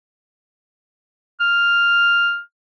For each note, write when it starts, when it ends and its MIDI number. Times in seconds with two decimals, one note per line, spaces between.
1.40 2.40 89